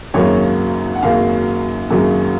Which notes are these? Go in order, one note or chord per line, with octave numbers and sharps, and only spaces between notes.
G#1 F#2 C#3 F#3 A#3 C#5
F#5
G#1 F#2 C#3 F#3 A#3 F5
G#1 F#2 C#3 F#3 A#3